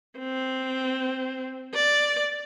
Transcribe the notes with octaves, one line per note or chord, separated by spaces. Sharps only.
C4
D5